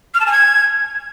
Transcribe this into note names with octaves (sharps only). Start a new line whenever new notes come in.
F6
A5
G#5
G#6